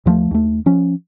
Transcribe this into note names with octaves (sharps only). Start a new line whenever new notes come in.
D#2 F3 F#3 A3
D#2 A3
F3 C#4